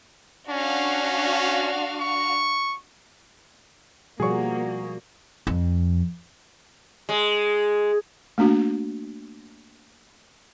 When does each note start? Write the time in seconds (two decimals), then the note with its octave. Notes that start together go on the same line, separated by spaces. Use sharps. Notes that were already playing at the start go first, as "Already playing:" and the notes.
0.50 C#4 D4 F#4 F5
2.00 C#6
4.20 B2 F3 G3 A#3 F#4 G#4 D5 C#6
5.47 F2
7.09 G#3
8.38 A3 A#3 D4 F#4